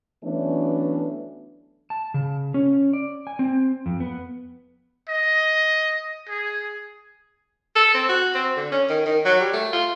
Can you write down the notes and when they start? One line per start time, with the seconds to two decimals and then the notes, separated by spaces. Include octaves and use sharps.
0.24 E3 F#3 A3 B3 C#4 D4
1.90 A5
2.14 C#3
2.54 C#4
2.93 D5
3.27 G#5
3.39 C4
3.86 F2
4.00 B3
5.09 D#5
6.29 G#4
7.76 A4
7.94 C4
8.09 F#4
8.34 C4
8.57 D3
8.72 C#4
8.89 D#3
9.06 D#3
9.25 F#3
9.40 G3
9.53 A3
9.73 F4